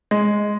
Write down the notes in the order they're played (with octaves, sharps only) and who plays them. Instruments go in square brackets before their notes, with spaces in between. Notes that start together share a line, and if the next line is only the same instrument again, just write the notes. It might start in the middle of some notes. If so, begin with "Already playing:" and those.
[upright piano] G#3